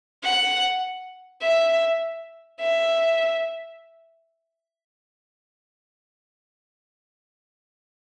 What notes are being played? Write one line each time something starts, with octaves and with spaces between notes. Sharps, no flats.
F#5
E5
E5